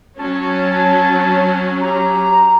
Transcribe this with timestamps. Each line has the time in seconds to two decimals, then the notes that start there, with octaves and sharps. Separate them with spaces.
0.19 F#3 C#4 A5
1.81 G4 A#5